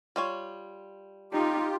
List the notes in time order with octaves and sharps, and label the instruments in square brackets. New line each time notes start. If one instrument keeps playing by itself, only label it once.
[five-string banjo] G3 F4 C#5
[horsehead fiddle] D#4 [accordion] F4 G4